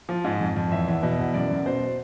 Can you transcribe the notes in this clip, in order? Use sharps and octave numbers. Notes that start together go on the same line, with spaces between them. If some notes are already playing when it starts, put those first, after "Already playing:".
F3
G#2
F2
F2
E2 E5
E2
B2
E2
F#2 D5
F#2
B2 C5